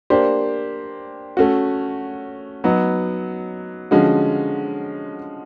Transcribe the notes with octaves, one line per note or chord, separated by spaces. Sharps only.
A#3 D4 G4 C5
A3 C#4 F#4
F#3 B3 D#4
D3 F3 G#3 C#4 F#4